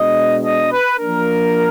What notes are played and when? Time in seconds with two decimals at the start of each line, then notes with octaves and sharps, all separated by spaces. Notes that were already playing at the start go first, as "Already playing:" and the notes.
Already playing: B2 G#3 D4 D#5
0.42 D#5
0.70 B4
0.98 F3 A#3 D4 A#4